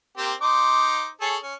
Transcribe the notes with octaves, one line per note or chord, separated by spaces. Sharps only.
A#3 C4 G4
D#4 C5 D6
G#4 A4 C#5
C#4